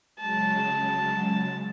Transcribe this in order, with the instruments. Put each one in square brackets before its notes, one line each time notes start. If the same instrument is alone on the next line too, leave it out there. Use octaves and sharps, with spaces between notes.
[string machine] C#3 F#3 G#3 [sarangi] A5